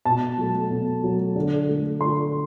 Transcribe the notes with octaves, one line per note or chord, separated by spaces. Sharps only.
B2 A5
F#3 A3
B2
F#3 A3
D3
A3
D3 C6